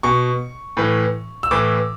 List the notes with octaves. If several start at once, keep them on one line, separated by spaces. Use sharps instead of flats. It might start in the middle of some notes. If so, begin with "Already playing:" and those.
B2 C#6
A2 E3
E6
A2 E3 D6